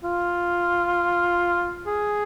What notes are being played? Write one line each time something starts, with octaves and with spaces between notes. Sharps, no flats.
F4
G#4